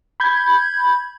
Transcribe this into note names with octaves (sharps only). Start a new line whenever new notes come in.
B5 G6 G#6